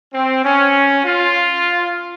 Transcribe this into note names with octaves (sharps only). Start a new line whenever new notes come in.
C4
C#4
F4